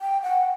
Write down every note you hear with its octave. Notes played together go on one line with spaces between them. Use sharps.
G5
F#5